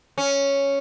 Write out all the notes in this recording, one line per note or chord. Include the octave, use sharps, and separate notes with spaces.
C#4